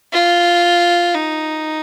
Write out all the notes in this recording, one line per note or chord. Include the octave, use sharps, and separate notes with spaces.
F4
D#4